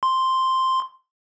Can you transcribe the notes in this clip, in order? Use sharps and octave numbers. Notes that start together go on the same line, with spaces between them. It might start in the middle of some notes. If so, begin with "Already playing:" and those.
C6